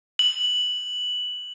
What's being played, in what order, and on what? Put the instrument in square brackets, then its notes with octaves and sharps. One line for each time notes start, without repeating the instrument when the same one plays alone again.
[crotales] F#7